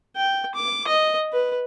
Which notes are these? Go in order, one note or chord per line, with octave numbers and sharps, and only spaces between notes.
G5
D6
D#5
B4